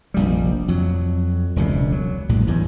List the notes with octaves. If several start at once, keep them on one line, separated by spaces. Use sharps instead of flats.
F1 A#1 G3
F2 F#3
E1 C#2 C3
F#3
A#1 A2 G3
A1 E2 G2